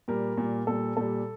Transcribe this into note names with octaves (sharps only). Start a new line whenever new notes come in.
A#2 G3 A#4
A#2 G3
A#2 G3 A4
A#2 G3 A4